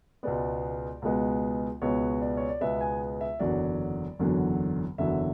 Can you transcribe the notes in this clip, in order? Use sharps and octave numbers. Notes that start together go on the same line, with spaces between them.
C#2 B2 G#3 B3 D5
C#2 B2 G#3 B3
C#2 B2 G#3 B3 C#5
D5
C#5
D5
C#2 B2 G#3 B3 E5
G#5
E5
F#1 E2 D3 F#3 D5
F#1 E2 D3 F#3
F#1 E2 D3 F#3 E5